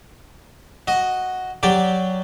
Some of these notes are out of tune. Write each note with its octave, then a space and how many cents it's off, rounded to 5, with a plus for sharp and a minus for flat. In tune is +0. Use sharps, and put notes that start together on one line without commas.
F#4 +0 D#5 +0
F#3 +5 G4 +0 D5 +0